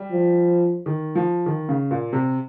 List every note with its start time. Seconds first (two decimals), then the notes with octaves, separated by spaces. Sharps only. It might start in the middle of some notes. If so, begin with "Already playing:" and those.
Already playing: G3
0.12 F3
0.86 D#3
1.15 F3
1.46 D#3
1.69 C#3
1.91 A#2
2.13 C3